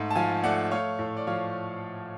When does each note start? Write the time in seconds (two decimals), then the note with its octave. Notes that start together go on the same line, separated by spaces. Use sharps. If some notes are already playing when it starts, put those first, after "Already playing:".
Already playing: G#2 A3
0.10 A5
0.16 F3 F5 G#5
0.43 A3 D5 F#5
0.71 A3 C#5 F5
0.99 A2
1.16 D5
1.27 F3 C#5 F5